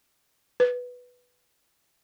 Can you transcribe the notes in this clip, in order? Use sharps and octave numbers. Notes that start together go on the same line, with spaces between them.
B4